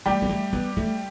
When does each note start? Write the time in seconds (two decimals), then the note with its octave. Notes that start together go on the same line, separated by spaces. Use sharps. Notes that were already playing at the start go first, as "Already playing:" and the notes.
0.06 G3 A3 G4
0.22 B3
0.29 A3
0.53 B3
0.77 A3